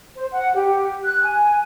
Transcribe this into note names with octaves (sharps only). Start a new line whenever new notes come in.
C5
F#5
G4
F#6
G#5